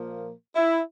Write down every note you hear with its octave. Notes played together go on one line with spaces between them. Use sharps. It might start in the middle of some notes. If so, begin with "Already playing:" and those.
Already playing: A#2 F3 A#3
E4